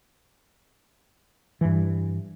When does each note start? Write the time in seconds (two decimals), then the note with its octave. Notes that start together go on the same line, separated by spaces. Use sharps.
1.61 G2 E3